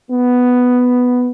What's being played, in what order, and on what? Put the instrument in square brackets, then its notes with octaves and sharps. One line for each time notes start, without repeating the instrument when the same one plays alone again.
[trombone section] B3